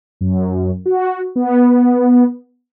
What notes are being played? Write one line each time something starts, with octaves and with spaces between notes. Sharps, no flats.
F#2
F#4
B3